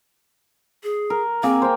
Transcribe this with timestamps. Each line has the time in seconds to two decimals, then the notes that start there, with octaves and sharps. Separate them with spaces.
0.83 G#4
1.10 A#4
1.43 A#3 C4 G#4
1.62 C5 G5